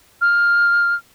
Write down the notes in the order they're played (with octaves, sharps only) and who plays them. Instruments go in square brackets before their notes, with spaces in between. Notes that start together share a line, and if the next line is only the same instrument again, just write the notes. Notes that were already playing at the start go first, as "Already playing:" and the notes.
[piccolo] F6